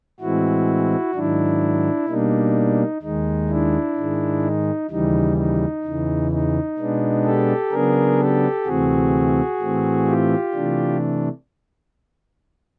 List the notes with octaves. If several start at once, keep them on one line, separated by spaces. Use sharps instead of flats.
A2 E3 G#3 C4 E4 F#4
G#2 D#3 F#3 D4 E4
B2 G3 A#3 D4 D#4
D#2 D#3 G#3 D#4
D4 E4
G#2 D#3 G#3
D#4
D#2 C#3 E3 G3 D#4
D#4
E2 C#3 E3
D#4
B2 G#3 B3 D4
G4 A4
C#3 F#3 B3 D4 G#4 A#4
G4 A4
D2 C3 E3 A3 C4 F#4 G#4
A2 E3 A3 C4
F4 G4
C3 E3 A3 D4